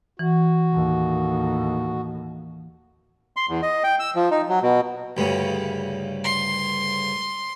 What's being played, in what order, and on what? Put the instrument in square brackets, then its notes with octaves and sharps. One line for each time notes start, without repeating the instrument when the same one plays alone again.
[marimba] E3 [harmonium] F#4
[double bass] D#2 A2
[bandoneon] C6
E2
D#5
G5
E6
F3
D#4
F#3
B2
[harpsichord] D2 G2 C#3
[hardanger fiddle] C6